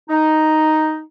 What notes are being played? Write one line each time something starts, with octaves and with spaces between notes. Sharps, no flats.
D#4